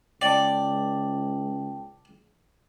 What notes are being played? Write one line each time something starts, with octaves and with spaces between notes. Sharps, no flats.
C#2 D5 G5 A5